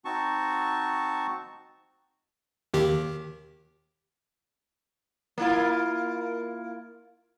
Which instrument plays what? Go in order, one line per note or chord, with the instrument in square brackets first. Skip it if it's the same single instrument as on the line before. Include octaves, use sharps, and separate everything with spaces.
[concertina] C4 D#4 F#4 A5 C#6
[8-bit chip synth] D#2 D#3 G4
[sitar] A#3 E4 F4